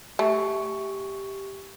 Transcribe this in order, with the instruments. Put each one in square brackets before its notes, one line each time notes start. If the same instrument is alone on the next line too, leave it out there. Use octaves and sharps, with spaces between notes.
[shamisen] A3 [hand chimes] G4 G#5 C#6